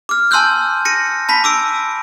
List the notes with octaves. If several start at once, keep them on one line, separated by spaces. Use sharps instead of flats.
D6 F6
G#5 A5 C6 E6 F#6 G6
A#6 C#7 D#7
A5 B5 B6
D6 E6 D7